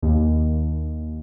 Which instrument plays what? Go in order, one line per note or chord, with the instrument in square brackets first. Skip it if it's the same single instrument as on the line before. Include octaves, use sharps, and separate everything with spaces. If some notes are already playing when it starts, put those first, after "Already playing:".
[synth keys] D#2